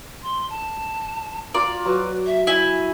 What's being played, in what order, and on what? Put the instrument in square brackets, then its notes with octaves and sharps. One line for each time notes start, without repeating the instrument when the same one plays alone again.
[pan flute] C6
A5
[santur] F4 A#5 [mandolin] D5
[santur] F#3 [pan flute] B4
[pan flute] E5
[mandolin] E4 [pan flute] G#5